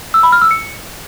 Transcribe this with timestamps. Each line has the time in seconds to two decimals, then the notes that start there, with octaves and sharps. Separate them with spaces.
0.14 E6
0.23 B5
0.32 F6
0.42 E6
0.51 C#7